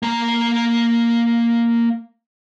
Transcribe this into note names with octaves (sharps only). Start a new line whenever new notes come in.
A#3 A#5